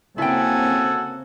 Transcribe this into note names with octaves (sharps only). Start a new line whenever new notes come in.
C#3 A#3 C4 E4 F#4 A4 G5 G#5